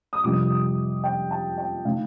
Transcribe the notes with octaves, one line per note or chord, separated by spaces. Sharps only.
D#6
F2 C3 G3 D4 D6
G5
A5
G5
D3 A3 D#4 F5